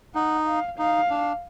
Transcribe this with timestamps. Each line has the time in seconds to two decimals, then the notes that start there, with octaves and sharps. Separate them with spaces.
0.15 D#4 F#5
0.47 F5
0.79 D#4 F5
1.10 D4